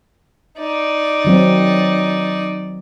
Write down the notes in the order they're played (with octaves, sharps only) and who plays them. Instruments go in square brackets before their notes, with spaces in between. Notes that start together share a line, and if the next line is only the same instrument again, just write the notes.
[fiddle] D#4 D5
[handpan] D#3 F#3 C4